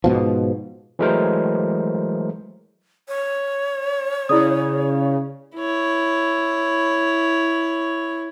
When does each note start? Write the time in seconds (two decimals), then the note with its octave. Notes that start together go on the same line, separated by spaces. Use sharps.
0.04 G#2 B2 F3
0.99 E3 F#3 G#3 A3 A#4 C5
3.08 C#5
4.29 C#3 E4 D5 D#6
5.56 E4 C#5